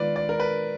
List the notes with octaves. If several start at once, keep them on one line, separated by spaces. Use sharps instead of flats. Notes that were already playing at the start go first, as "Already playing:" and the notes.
Already playing: D#3 G#3 B3 F4 B4 D5
D5
A#4
B4